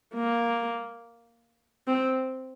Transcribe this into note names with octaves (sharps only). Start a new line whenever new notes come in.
A#3
C4